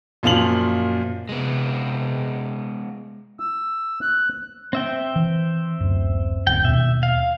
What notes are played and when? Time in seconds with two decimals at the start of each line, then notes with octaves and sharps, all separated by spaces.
0.23 F#2 A#2 F3 F7 F#7
1.29 C3 G#3 B3
3.40 E6
4.02 F#6
4.73 C4 E5 G5
5.16 E3
5.80 D1 F#2
6.47 D1 G2 C4 G5
6.65 D#2 B2 E5
7.03 F5